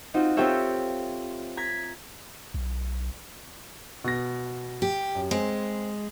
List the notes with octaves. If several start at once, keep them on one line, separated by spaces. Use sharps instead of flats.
C4 D#4 F4 F#4
C4 F4 G4 A4 C#5 E5
A#5 G#6 B6
B1
B2 A#6
G4
F#2
G#3 C4